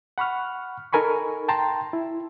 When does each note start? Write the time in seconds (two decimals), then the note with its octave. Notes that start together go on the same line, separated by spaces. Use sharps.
0.18 F#5 B5 C#6 F6
0.92 D#4 A4 A#4 G#5 B5 C#6
1.48 G5 A5 A#5 C6
1.93 E4